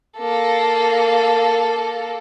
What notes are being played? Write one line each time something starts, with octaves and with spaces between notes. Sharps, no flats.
A#3 A4